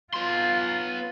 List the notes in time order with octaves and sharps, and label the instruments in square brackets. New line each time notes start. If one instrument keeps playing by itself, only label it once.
[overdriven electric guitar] B3 C6 [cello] F4